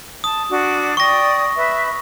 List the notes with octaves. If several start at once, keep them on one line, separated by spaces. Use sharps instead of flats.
A5 D#6
D4 F#4 D6
D5 G5 C#6 D#6 A#6
B4 E5